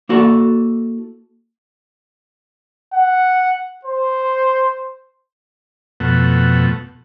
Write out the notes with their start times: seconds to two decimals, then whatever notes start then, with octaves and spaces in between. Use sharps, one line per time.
0.09 A#3 E4 F#4 A4 D5
2.93 F#5
3.85 C5
6.00 F2 B2 A3 F#5